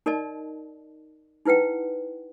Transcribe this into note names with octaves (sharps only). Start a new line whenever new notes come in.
D#4 A#4 D5 D#5 A5
D#4 E4 B4 F#5 G5